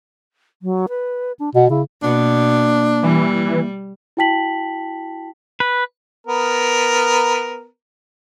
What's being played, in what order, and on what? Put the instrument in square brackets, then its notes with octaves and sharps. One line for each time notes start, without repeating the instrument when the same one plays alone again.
[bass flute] F#3
B4
D4
[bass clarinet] B2 [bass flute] F#5
[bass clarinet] C#3 [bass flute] E4
[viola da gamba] B2 [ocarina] A#3 [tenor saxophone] D4
[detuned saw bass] E3 [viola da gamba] G3
[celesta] E4 F#4 G5 A5 B6 F#7
[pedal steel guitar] B4
[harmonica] B3 A#4